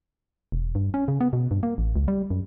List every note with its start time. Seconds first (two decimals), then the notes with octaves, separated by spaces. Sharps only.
0.52 E1
0.75 G2
0.94 C#4
1.08 C#3
1.20 B3
1.33 B2
1.51 G2
1.63 A#3
1.78 A1
1.96 C#2
2.08 G3
2.30 F#2